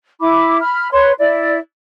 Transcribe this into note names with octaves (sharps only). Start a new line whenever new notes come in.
E4 B5 D6
B5 F6
B4 C#5 C6
E4 D5